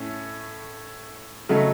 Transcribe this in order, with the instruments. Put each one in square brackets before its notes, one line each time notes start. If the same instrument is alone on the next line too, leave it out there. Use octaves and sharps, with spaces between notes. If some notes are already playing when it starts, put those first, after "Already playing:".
Already playing: [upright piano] A2 A3 C#4
C#3 F#3 A3 D#4